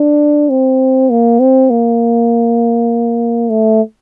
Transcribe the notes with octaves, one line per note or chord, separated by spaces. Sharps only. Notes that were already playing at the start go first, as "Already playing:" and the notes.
Already playing: D4
C4
A#3
C4
A#3
A3